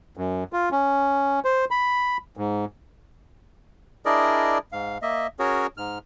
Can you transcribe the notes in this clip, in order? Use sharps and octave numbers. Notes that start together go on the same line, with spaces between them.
F#2
F4
C#4
C5
B5
G#2
D4 E4 G#4 A#4 D5 D#5
G#2 F5
A#3 D#5 E5
C#4 F#4 G#4 A#4 C#5
G#2 F6